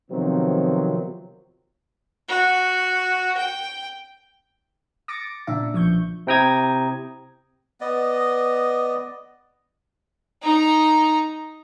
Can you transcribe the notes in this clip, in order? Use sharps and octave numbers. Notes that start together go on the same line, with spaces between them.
C3 D#3 F3 F#3 B3 C4
F#4
G5
D6 A6 A#6 C#7 D7
A#2 C#3 D4 E5
B1 F3 C#6 G6
C3 E4 G5 A#5 D#6 G#6
B3 D5 D#5
D#4 A#5